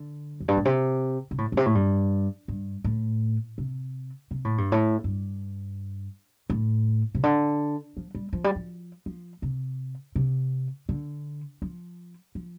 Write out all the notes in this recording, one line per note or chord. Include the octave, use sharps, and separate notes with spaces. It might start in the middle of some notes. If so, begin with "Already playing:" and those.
Already playing: D3
F2
G2
A2
C3
C3
A2
A2
C3
A2
G2
G2
A2
C3
C3
A2
G2
A2
G2
A2
C3
D3
F3
G3
F3
G3
F3
F3
C3
C3
D3
F3
F3